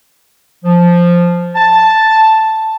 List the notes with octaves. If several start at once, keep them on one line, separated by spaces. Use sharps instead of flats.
F3
A5